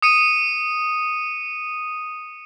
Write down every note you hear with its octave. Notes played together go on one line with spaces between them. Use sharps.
D#6 C#7 D#7